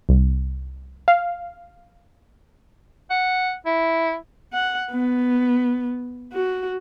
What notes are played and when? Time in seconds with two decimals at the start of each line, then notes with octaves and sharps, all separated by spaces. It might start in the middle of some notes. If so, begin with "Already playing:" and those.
0.09 C2
1.08 F5
3.10 F#5
3.66 E4
4.53 F#5
4.91 B3
6.33 F#4